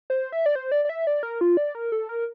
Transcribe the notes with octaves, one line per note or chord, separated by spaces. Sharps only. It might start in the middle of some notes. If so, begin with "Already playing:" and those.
C5
E5
D5
C5
D5
D5
E5
D5
A#4
F4
D5
A#4
A4
A#4